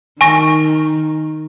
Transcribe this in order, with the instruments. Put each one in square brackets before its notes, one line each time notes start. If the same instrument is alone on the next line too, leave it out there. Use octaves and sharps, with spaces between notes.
[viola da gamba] D#3 [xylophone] G#5 C#6 A#6